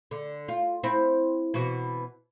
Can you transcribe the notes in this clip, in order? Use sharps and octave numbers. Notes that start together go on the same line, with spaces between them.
D3
F4
C4 E4
B2 E3 F#4